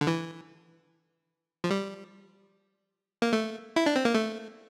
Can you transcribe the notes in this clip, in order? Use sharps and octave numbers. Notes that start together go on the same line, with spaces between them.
D3
E3
F3
G3
A#3
A3
E4
D4
C4
A#3
A3